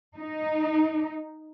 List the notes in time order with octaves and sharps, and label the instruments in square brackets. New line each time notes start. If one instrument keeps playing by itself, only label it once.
[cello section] D#4